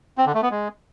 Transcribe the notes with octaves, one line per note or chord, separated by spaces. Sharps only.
C4
D3
A3
B3
G#3